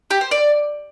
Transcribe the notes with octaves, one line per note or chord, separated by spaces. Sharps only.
G4
C5
D5